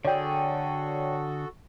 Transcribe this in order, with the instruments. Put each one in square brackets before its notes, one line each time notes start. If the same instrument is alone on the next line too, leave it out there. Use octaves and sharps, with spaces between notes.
[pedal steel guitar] D3 G#4 [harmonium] F#4 A4 [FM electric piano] C#5 D5 G5